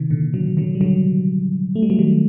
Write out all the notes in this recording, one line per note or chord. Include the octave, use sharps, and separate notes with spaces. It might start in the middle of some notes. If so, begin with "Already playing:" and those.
Already playing: C3 D#3
A#2 D3
D3 F#3
D3 F#3
G3
D3 F#3
A3
G3
F#3 A3
D#3 G3